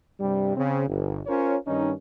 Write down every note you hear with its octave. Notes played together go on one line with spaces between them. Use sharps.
G2 C3 G3
C#3 C4
G1
C#4 F4 A#4 C5 C#5
G2 D#3 C#4 D#4